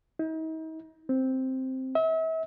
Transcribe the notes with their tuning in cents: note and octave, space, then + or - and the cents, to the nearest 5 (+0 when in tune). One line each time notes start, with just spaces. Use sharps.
D#4 +40
C4 +0
E5 -40